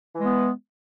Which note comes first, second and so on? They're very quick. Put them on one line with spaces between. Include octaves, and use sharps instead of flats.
E3 G#3 B3